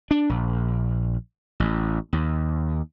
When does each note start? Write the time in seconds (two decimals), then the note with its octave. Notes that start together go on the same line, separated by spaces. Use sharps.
0.11 D4
0.29 A#1
1.60 A1
2.13 D#2